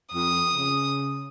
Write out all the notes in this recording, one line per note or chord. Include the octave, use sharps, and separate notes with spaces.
F2 D#6
C#3